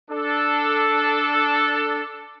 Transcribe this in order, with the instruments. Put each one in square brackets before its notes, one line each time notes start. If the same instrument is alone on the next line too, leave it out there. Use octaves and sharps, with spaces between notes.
[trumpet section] D4 A4